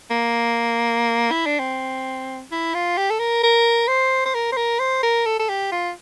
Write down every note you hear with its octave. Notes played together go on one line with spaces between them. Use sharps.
A#3
E4
D4
C4
E4
F4
G4
A4
A#4
A#4
C5
C5
A#4
C5
A#4
C5
A#4
A4
A4
G4
F4